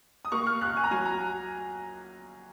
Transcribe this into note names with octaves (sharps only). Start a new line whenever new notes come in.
D#6
A#3 C#6
F6
C#2 F#6
G#5
A#5
F#3 G#5
A#5